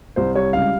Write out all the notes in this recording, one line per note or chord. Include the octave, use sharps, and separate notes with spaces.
C2 C5
G3 C#5
C#2 F5